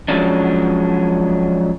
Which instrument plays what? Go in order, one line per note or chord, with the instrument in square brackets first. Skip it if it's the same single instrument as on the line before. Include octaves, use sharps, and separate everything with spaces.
[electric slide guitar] F3 F#3 G#3 C#4 D4